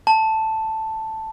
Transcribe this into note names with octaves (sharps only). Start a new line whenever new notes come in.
A5